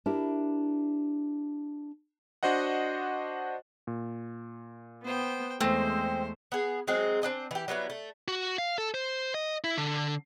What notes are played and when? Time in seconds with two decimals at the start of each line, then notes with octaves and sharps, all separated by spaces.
0.06 D4 E4 G4 A#4
2.43 D4 F#4 C5 D#5 F#5
3.87 A#2
5.04 B3 C5 G5
5.61 E2 G#3 A3 C4 C5
6.52 B3 G#4
6.87 F#3 G#3 C4 G#4
7.22 C4 D4 D#4 G#5
7.51 E3 G4
7.68 F#3 G3 B3 E4
7.90 A3
8.28 F#4
8.58 F5
8.78 A4
8.94 C5
9.34 D#5
9.64 E4
9.78 D3